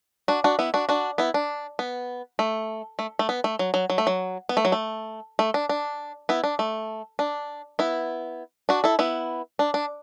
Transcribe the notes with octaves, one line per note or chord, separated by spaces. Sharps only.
D4 F#4
D4 F#4
B3 E4
D4 F#4
D4 F#4
B3 E4
D4
B3
A3
A3
A3
B3
A3
F#3
F#3
F#3
A3
F#3
B3
A3
F#3
A3
A3
D4
D4
B3 E4
D4
A3
D4
B3 E4
D4 F#4
E4 A4
B3 E4
D4
D4